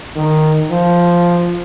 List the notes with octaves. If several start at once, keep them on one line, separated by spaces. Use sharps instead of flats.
D#3
F3